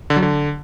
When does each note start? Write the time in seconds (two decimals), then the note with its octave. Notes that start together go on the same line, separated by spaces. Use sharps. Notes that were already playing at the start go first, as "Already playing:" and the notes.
0.10 D3
0.16 F#3
0.22 D3